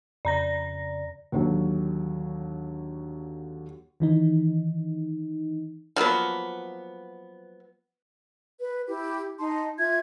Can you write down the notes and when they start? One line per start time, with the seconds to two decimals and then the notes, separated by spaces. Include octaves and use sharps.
0.25 F2 C#3 D5 A#5 A#6
1.32 D#2 D3 F#3
4.00 D#3 E3 D#4
5.96 F3 F#3 A#3 B3
8.59 B4
8.86 E4 G4
9.38 D#4 A5 C6
9.77 F4 E5 G#6